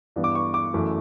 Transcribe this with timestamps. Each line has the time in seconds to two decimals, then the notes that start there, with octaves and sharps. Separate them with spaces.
0.16 G2 E3 B3
0.24 D6
0.35 C#6
0.54 D6
0.74 F#2 E3 A3